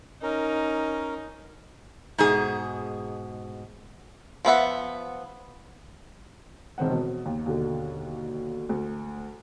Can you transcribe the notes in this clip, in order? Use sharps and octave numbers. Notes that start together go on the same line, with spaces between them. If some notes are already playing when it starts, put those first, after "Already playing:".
C#4 D#4 A#4
G#2 B2 G#4
F3 B3 E5 F#5
E1 D#3 C4 F#5
B2
D#2
D#2 B2 D3
D2